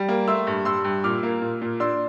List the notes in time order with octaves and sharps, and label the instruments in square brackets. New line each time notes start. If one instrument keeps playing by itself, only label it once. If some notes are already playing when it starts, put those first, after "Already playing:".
Already playing: [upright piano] G3
A#3
A3 C6 E6
G2
G2 C6 E6
G2
A#2 D6 F6
A#3
A#2
A#2
D4 C6 E6